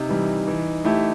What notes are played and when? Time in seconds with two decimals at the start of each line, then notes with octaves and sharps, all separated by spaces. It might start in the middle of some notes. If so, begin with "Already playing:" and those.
Already playing: C3 D#4
0.09 E3 G3
0.47 E3
0.85 A3 E4 G4